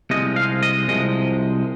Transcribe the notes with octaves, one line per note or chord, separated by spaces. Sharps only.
C2 C3 F3 G#3 D#5
F5
D#5
C2 C3 F3 G#3 D#5